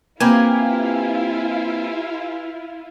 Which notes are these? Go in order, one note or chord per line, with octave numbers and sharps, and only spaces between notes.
A#3 C4 E4 F4 G4 B4 G#5